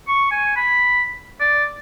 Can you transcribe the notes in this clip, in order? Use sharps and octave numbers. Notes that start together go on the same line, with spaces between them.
C#6
G#5
B5
D5